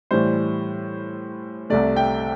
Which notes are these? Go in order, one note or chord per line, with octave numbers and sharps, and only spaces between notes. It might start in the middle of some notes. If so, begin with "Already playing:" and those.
A2 E3 G3 C5
C2 C3 A3 D5
G5